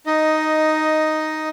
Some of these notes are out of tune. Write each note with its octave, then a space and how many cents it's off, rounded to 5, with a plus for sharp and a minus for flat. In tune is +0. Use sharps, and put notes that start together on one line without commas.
D#4 +0 D#5 +5